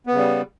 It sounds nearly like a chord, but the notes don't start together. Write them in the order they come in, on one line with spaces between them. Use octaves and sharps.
B3 C#3 G3